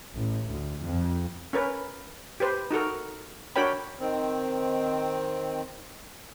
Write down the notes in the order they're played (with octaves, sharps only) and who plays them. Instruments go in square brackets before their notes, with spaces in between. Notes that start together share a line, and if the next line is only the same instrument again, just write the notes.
[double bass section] A1
D2
F2
[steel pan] C#4 A#4 B4
G4 B4 C5
D#4 F#4 A4 A#4
D4 F#4 A#4 C#5 G5 B5
[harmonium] D#3 C4